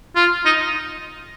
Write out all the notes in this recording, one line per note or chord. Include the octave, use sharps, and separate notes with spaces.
F4
D#4